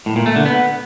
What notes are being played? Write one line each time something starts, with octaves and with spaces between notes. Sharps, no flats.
A2
A#2
A3
D3
B3